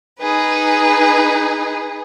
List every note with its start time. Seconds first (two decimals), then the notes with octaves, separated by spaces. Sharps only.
0.20 D#4 G#4 B4